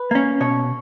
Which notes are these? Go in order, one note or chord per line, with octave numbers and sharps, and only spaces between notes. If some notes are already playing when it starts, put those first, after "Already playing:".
Already playing: B4
A#3 C#4
B2 C#5